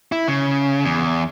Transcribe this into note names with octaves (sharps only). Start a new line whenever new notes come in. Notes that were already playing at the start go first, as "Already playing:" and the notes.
E4
C#3
E2